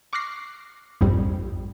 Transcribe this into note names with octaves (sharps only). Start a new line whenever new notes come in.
C#6 D6 F6 F#6 A#6 C7
A#1 F2 G#2 G3